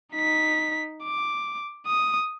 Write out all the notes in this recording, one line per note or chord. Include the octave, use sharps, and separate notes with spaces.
D#4 B6
D6
D#6